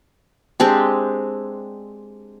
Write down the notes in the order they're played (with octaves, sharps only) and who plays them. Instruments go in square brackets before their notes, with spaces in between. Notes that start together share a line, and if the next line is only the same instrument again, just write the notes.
[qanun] G#3 C4 D4 G4